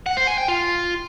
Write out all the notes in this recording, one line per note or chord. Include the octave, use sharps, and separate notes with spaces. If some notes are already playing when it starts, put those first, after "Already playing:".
F#5
C5
G#5
G5
F4